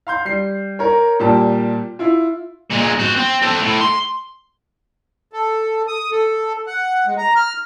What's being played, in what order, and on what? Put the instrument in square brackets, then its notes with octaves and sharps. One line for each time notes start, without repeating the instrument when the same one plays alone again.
[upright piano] F5 C6 G6
G3 C7
A#4 C#5
A#2 G3 G4 A5
E4 F4
[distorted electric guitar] A#2 G#3
C4 F#4
C4
A4 C5
A2
C6
[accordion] A4
D#6
A4
F#5
G#3
A#5
F6